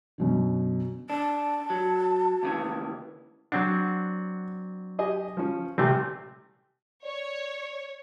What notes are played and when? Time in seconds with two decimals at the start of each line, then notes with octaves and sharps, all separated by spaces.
0.18 F#2 B2 D3
1.10 D4 A5
1.70 F#3
2.43 D#2 C#3 E3
3.52 F#3 C4 D4 F#5
4.99 G4 D#5 G#5
5.37 F3 C#4
5.78 A1 C3 G3 A3 C4 G#5
7.04 C#5 D5